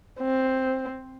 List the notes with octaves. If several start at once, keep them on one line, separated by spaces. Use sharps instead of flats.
C4